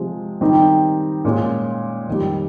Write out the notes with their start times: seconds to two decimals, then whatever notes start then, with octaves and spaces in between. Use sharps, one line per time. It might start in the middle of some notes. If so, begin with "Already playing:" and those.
Already playing: C3 F3 G#3
0.41 D#3 G3 C4 D#4 G4
1.25 A#2 G#3 C#4 F4
2.07 F2 D#3 G3